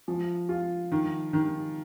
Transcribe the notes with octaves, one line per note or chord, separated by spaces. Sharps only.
F3
F4
D#3
D#3